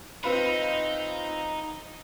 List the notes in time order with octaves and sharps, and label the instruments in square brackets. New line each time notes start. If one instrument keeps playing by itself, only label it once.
[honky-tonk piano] C4 F4 B4 [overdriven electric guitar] D#4